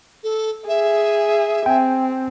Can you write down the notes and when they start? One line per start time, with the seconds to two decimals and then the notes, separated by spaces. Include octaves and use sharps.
0.24 A4
0.68 G#4 E5
1.66 C4 G5 G#5